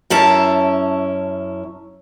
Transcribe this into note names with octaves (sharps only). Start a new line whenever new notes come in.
F#2 C#4 E4 A5